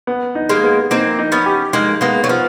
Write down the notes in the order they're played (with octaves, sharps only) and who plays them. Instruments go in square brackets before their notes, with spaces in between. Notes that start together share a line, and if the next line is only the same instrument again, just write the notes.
[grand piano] B3
D#4
[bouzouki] G#3 A#3
[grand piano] B3
[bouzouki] A#3 C4 [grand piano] D#4
[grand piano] D#4
[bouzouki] B3 C#4
[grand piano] G4
[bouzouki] G#3 A#3 [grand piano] D#4
[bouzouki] G#3 A#3 [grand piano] B3
[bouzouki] F#3
[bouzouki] F3 [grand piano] B3